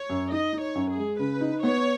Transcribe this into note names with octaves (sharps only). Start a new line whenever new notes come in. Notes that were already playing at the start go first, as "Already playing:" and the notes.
Already playing: C#5
F#2
D#4 D#5
D#4
C#5
F#2
G#4
G#3
C#3 B4
D#4
B3 C#5